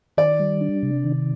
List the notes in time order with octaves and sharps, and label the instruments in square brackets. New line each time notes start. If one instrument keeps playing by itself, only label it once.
[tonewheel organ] D#3 [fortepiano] D5
[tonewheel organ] G3
D4
C3
D#3